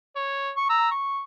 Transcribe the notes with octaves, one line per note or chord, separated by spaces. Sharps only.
C#5
C#6
A#5 E6
C#6